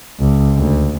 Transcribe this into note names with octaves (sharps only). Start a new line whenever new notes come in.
C#2
D2